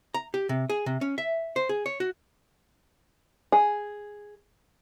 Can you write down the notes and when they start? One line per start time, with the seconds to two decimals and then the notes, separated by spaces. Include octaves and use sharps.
0.14 A#5
0.34 G4
0.49 C3
0.70 G#4
0.86 C3
1.01 C#4
1.18 E5
1.56 C5
1.69 G#4
1.86 C#5
2.00 F#4
3.52 G#4